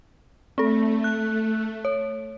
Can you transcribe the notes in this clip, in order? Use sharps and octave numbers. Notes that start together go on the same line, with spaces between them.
A3 C4 A4
F#6
C#5